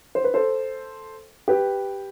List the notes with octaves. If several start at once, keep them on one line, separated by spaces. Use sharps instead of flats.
C5
B4
A4 C5
G4 B4